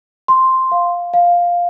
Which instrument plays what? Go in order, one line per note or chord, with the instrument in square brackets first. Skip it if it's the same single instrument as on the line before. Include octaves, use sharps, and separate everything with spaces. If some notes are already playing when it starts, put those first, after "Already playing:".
[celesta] C6
F5
F5